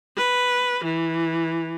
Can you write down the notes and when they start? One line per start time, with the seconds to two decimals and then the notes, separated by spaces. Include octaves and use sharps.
0.17 B4
0.84 E3